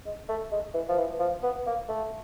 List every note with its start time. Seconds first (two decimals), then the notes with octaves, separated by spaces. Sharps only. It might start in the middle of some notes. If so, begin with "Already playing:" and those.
0.06 G#3
0.29 A3
0.52 G#3
0.74 E3
0.89 F3
0.98 E3
1.20 F3
1.43 B3
1.67 A#3
1.89 A3